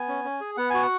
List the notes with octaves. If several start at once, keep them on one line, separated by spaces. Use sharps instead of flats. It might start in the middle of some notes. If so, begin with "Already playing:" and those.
Already playing: B3 G#5
C#4
C#4
G#4
B3 F#5
F#4 G#5
F#5